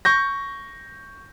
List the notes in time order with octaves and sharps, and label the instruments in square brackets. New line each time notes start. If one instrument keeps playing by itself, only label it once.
[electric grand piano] C#6 G6 A#6